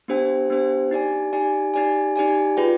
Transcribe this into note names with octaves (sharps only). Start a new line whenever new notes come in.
B3 D4 G4 C5 G5
B3 D4 G4 C5 G5
D#4 G4 D5 G#5
D#4 G4 D5 G#5
D#4 G4 D5 G#5
D#4 G4 D5 G#5
F4 G#4 B4 D5 G5